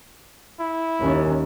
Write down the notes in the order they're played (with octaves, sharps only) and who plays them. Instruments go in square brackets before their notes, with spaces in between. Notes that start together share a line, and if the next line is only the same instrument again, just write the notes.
[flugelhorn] E4
[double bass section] D#2 C#4